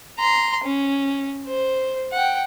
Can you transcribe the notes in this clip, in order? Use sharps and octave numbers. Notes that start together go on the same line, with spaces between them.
A#5 C6
C#4
C5
F#5 G5